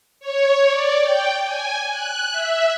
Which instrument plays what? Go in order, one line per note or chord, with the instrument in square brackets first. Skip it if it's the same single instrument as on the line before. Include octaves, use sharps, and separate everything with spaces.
[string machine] C#5
D5
G5
G#5
F#6
E5